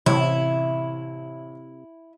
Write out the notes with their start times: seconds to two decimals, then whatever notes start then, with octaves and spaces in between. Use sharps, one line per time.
0.06 A1 C3 E4 C#5